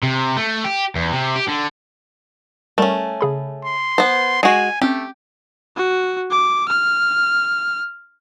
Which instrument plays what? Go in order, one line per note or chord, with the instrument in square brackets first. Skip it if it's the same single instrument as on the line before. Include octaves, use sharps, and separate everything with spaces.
[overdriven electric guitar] C3
A3
G4
E2
C3
G4
D3
[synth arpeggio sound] G3 A#4 [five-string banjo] A3 C#4
[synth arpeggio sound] C#3 G#4 B5
[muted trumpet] C6
[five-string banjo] B3 C5
[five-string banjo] G#3 F#4 [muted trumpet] G#5 [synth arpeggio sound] C7
[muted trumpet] A3 [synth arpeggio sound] C4 C#4 [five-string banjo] G4
[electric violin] F#4
D6
F6